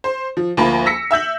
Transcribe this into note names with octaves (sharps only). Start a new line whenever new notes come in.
C5
F3
D2 F3 A#3 A5 B5
E6 A#6 B6 C#7
E5 E6 G6 F#7